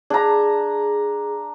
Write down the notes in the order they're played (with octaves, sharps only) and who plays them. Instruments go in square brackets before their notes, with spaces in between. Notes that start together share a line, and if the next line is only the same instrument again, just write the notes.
[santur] D4 A#5 [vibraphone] G#4